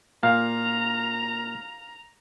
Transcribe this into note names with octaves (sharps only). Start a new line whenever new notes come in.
A#2 F5 A#5